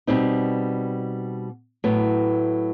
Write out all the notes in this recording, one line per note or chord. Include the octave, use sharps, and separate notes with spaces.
B2 G3 C4 D#4
A2 F#3 B3